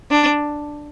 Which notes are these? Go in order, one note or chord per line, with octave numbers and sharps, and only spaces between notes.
D4